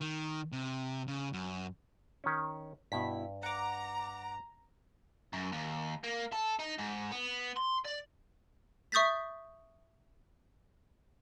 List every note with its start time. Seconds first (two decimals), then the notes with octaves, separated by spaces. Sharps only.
0.01 D#3
0.52 C3
1.08 C#3
1.33 F#2
2.24 D#3 C#4
2.92 G2 B2 E4 B6
3.43 F#5 A#5 D6
5.33 F#2
5.52 D#2
6.03 A#3
6.32 A4
6.59 D#4
6.79 G#2
7.12 B3
7.57 C6
7.85 D5
8.92 E5 C#6 D#6 G6 A6 B6